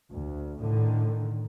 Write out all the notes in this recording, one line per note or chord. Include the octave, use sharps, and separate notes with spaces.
D2
A2 D3 D#3